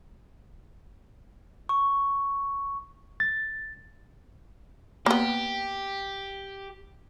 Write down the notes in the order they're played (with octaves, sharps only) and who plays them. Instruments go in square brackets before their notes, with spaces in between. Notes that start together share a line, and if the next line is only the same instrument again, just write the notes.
[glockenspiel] C#6
[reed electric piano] A6
[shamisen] A#3 B3 [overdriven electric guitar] G4